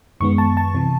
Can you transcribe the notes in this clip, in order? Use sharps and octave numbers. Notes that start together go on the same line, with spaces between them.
F#2 D#3 G#3 B3 C#6
A5
A5
C3 E3